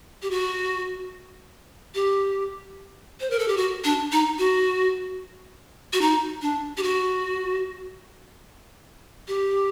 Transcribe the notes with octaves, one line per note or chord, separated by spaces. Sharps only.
G4
F#4
G4
C5
A#4
A4
G4
F#4
D4
D#4
F#4
F#4
D#4
D4
G4
F#4
G4